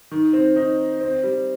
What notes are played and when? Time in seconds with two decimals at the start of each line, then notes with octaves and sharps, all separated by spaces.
0.11 D#3
0.33 C4
0.56 D#4
1.01 C4
1.23 G3